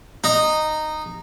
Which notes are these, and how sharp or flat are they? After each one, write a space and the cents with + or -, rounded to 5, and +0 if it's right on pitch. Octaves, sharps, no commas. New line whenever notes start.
D#4 -10